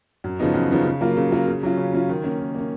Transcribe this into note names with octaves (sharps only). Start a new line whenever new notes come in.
F#2
C#3 F3 B3 D#4
F#2
C#3 F3 B3 D#4
C#3
F#3 A#3 F4
C#3
F#3 A#3 F4
C#3
F#3 C#4 F4
C#3
F#3 C#4 F4
D#3
A#3 C#4
D#3
A#3 C#4